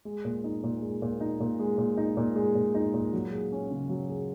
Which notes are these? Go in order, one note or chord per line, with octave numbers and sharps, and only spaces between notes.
G#3
A#2
D#4
A#2
G#3
A#2
D#4
A#2
G#3
A#2
D#4
A#2
G#3
A#2
D#4
A#2
F#3
G#4
C#4
C#3
F#3
G#4